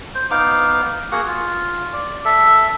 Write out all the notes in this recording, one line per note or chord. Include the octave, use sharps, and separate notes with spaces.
C5
B3 D#4 F5 D6
A#3 F#4 G#4 F#5
F4
D5
A4 E5